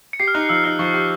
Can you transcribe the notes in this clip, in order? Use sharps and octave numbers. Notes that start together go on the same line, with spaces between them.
C#7
G4 C7
F6
D#4 F#6
F3 E6
D#4 F6
F3 C#6
G4